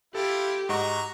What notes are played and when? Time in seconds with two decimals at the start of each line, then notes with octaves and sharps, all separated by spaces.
0.15 E4 F4 G4 A4
0.69 G#2 F#4 D#5 F#5 A#5 C#6